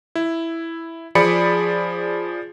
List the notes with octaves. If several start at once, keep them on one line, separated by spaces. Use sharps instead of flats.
E4
F3 G#4 D5 B5 C#7